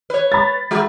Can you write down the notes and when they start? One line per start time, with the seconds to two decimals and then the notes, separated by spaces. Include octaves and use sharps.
0.10 B4 C#5
0.32 B5 A6
0.71 G#3 F#4